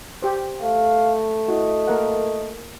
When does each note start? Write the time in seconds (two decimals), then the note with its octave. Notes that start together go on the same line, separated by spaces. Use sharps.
0.22 G4 C5
0.62 A3 F5
1.48 E4 F#4 D#5
1.87 A#3 A#4 F#5